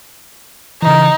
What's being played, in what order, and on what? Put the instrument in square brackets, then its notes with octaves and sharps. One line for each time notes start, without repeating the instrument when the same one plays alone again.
[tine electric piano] C#3 E3 [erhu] D#4